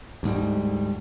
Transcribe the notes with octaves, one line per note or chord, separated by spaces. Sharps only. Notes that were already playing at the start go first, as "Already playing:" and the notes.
D2 G#2 G3